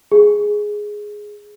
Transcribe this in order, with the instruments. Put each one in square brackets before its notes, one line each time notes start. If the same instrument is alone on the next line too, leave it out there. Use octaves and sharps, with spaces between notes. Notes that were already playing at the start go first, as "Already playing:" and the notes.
[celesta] G#4